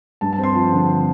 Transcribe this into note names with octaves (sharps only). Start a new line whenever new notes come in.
G2 A5
A5
C4
C6
F3 A5
D3